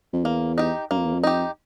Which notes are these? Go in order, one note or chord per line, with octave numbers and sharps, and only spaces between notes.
F2
E2 A#3
D#4 G4
F#2 A#3
F2
E2
F2
D#4 G4